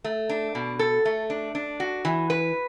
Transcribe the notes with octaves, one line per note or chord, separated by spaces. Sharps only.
A3
D4
B2
A4
A3
D4
D4
F#4
E3
B4